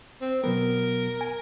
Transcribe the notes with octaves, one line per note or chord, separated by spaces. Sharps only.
C4
B2 F#3 B3 A#4
G#5